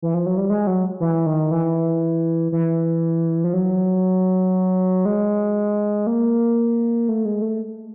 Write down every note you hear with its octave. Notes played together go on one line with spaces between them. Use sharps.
E3
F3
F#3
G3
G#3
F#3
E3
D#3
E3
E3
F3
F#3
G#3
A#3
A3
G#3
A3